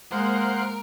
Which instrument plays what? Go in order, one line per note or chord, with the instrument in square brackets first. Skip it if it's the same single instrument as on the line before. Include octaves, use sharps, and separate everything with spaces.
[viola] G#3 A#3 [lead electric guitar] A#4 [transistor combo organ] C5 F5 F#5